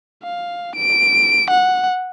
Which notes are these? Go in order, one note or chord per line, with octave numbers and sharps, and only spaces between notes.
F5
D7
F#5